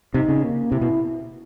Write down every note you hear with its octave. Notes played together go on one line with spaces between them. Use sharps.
C3 D#4
C#3
A#3
C3 E4
B2